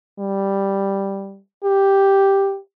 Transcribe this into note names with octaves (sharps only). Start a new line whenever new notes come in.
G3
G4